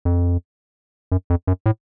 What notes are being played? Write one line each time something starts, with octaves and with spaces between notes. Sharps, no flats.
F2
F#2
F2
F#2
A2